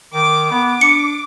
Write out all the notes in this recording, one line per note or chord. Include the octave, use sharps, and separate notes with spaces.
D#3 D6
B3 D6
D4 C#7